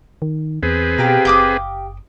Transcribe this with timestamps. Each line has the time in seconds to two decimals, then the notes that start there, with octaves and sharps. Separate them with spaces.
0.22 D#3
0.63 E2 C4 G#4 B4
0.98 B2 G4 F5 A#5
1.25 F#1 G5 D6 D#6